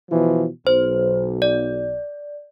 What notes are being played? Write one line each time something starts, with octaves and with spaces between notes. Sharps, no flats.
B2 E3 F3
B1 C5
D5